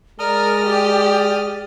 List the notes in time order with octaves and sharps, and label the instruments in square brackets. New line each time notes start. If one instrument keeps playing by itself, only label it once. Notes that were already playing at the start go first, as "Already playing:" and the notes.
[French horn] G#3 [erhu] A#4 [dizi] D5 [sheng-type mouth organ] D#6 F6
[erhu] G4 [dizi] D5